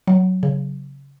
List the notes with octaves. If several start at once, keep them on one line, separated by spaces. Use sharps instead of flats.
F#3
C#3